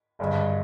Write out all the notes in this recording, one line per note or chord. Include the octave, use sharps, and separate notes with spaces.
G#1 G2 D3 G#3